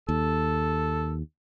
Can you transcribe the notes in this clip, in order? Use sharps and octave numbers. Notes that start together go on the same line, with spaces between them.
D#2 A4